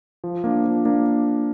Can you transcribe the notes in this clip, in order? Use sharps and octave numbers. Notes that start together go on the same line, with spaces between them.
F3
A#3 D4
F3
A#3 D4